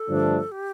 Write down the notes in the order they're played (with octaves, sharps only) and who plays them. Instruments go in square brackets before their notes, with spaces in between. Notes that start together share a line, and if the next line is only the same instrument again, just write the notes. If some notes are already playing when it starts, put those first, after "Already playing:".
Already playing: [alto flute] A4
[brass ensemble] G2 D3 F3 A3 D4
[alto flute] G4